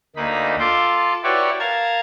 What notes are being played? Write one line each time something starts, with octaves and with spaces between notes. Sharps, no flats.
D2 A#3 D#4 B5
F4 A4 C6 D6
E4 F#4 G4 B4 C#5 D5
A#4 F5 A5 A#5 G#6